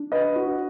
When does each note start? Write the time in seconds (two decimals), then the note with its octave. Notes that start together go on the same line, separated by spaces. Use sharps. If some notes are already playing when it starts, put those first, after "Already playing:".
Already playing: D4
0.12 B4 D#5
0.36 F#4